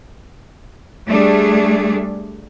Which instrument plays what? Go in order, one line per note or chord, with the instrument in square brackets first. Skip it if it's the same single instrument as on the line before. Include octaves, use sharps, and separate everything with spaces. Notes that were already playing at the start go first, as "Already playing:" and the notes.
[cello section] G3 A3 D4 G#4